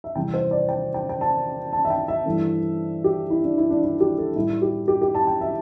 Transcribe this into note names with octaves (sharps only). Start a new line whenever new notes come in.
E5
E2 C3 G3 G5
C5
D5
G5
G5
G5
A5
A5
E5
G5
E5
G2 E3 A3
G4
E4
D4
E4
D4
E4
G4
A4
A2 G3 E4
G4
G4
G4
A5
G5
E5